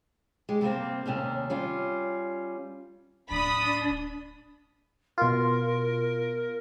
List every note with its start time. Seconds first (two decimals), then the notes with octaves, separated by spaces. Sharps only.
0.49 G#3 G4
0.61 C3 G3 A3 A#3 C4
1.06 D#2 C3 C#4 D4
1.50 G3 C#4 F4
3.31 D1 D4 B5 D#6
5.18 B2 F4 A#4